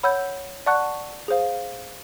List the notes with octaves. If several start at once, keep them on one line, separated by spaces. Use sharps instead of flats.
C#5 F#5 B5 E6 G6
D5 F#5 A5 C#6 F#6
G#4 C5 F5